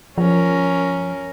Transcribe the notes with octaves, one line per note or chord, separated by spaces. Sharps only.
F3 C#4 A#4